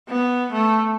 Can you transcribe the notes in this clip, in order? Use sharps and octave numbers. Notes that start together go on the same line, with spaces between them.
B3
A3